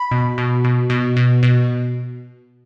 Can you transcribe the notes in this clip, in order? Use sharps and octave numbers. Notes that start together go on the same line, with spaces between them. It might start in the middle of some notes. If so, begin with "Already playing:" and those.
Already playing: B5
B2
B2
B2
B2
B2
B2